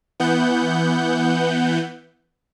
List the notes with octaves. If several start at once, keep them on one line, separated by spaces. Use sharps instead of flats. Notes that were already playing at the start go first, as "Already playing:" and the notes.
E3 B3 F#5 G6